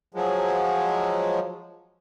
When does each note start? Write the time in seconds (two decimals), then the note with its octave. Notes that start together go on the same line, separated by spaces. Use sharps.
0.14 F3 F#3 G#3